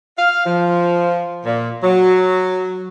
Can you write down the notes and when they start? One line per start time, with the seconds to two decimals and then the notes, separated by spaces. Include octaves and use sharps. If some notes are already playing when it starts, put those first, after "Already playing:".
0.17 F5
0.45 F3
1.45 A#2
1.82 F#3